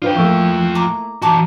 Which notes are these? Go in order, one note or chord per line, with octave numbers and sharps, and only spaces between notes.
D4 F4 B4 C5 G5
F3 A3 A#3 E4 C#6 E6
A#5 D6
E3 D#4 F#4 A5 A#5 D6